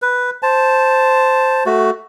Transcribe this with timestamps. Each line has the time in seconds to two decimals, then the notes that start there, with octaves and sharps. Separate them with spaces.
0.02 B4
0.43 C5 A5
1.66 A3 F#4